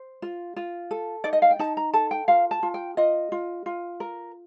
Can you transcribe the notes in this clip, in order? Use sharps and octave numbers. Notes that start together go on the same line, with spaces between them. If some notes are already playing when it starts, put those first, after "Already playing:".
Already playing: C5
F4
F4
A4
D#4 D5
D#5
F5
G5
D#4 A5
A#5
A4 A5
G5
F4 F5
A5
F4
G5
F4 D#5
F4
F4
A#4